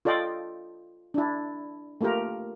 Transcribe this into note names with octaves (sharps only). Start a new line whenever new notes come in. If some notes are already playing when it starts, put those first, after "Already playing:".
F4 A4 D5 D#5 G5
D4 E4
A3 A#3 F4 G4 A#4